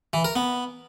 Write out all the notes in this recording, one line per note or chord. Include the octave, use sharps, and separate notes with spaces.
E3
A#4
B3